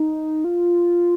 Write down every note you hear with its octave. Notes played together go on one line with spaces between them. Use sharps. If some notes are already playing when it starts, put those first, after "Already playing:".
Already playing: D#4
F4